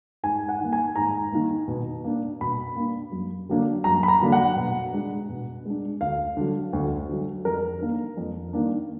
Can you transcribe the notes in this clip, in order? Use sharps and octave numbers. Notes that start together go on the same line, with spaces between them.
G#2 G#5
F#5
D#3 A#3
G#5
G#2 A#5
D#3 A#3
B2
A#3 D4
B2 B5
A#3 D4
F#2
D3 F#3 A#3 D4
F#2 A#5
B5
A#5
D3 F#3 A#3 D4
F#5
B2
G#3 D4
B2
G#3 D4
D2 F5
D3 F#3
D2
D3 F#3
F2 A#4
D#3 A#3 D4
F2
D#3 A#3 D4